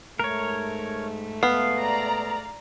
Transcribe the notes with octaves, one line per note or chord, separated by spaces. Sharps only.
G#2 A3 A#4 C#5
B3 F5
D5 A#5